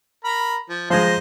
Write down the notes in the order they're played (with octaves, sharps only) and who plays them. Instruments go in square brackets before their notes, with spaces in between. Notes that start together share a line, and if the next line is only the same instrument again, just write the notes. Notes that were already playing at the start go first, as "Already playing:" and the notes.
[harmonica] A#4 A#5 B5
F3
[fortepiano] F3 G#3 [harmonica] C5 D#5 A#5